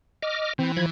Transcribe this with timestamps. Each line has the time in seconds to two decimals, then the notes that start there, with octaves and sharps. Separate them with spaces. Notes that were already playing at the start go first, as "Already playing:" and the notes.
0.23 D#5 D6 F6
0.59 E3 C4
0.77 F3 B5 G#6